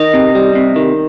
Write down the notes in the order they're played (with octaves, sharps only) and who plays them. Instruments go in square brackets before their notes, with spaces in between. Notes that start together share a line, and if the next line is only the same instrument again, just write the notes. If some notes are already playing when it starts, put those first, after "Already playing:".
Already playing: [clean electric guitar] D#3 [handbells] D#5
[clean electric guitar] C3
G3
C3
D#3